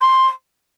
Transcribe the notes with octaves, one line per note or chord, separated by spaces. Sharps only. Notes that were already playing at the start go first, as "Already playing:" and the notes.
C6